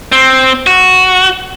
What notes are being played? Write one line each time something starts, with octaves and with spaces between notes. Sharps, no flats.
C4
F#4